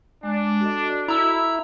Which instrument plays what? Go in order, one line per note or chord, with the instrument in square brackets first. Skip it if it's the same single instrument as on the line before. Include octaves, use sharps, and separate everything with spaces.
[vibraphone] G#3 [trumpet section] D4
[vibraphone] F#4 A4 D#5
[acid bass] E4 [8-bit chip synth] A#5 E6